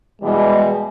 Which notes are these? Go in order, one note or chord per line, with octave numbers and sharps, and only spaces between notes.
B2 E3 G3 G#3